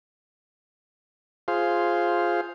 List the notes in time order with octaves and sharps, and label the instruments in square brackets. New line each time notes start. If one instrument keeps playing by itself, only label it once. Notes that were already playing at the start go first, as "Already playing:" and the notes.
[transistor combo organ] F4 G#4 C5 F5